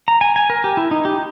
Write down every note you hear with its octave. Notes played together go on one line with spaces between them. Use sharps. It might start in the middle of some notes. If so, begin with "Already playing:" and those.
A#5
G#5
G#5
A#4
G4
E4
D#4
G4